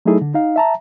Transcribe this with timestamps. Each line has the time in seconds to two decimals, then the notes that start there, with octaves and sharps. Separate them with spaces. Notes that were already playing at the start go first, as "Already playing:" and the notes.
0.06 F#3 A3 D#4 E4 G#4 A4
0.21 D3
0.34 D#4 F5
0.56 E5 A5 A#5